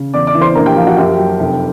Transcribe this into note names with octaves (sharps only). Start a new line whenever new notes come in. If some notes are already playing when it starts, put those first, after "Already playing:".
Already playing: C#3
E2 D5 D6
D5 D6
E3
C5 C6
A#1 A#4 A#5
G4 G5
F3 F4 F5
F#4 F#5
F#2 G4 G5
F#3
F1